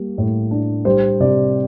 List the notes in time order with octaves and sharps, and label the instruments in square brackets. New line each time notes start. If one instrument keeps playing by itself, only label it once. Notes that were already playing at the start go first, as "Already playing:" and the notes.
Already playing: [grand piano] G3 A#3
A2
D4
G3 C5
C3 D5